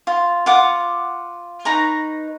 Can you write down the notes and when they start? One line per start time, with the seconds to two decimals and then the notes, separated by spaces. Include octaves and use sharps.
0.07 F4
0.46 F4 F#5 D6
1.65 D#4 B4 A#5 C#6